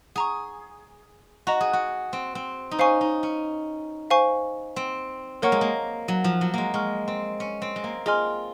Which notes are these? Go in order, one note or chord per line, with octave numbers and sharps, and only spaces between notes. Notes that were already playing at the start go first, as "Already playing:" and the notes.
G#4 F#5 A#5 C#6
F#4 D#5 A#5 C#6
G#4
F#4
C4
C4
D#4
C#4 C5 F5 G#5 C#6
D#4
C#4
C5 F5 G#5 C#6
C4
A#3 A#4 C#5 F#5 C#6 F6
G#3
A#3
F#3
F3
F#3
G#3 A#3
G#3 F#5 C#6 F6
C4
C#4
C4
G#3
A#3
F4 G#4 D#5 G#5 C6 F6